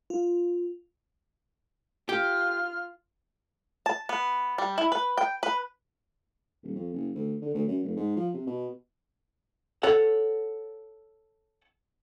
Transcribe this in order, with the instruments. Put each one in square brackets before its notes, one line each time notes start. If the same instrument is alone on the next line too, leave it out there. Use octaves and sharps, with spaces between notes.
[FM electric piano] F4
[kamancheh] F4 F6 [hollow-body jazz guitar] G4
[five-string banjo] A5
B3
G3
E4
B4
G5
B4
[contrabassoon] D#1
F2
F#1
D2
D3
D2
F#2
F1
G#2
F3
C3
B2
[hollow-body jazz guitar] A4 C#5 F#5